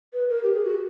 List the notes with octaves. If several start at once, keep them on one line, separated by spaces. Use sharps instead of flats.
B4
A#4
G4
G#4
F#4